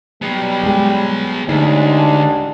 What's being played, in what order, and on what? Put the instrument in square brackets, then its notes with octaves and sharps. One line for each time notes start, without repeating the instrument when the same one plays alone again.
[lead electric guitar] F#3 B3 [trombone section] G3
[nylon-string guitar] G#3 G5
[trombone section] A1 G#3 D4 [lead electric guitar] D2 [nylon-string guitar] D#4 D5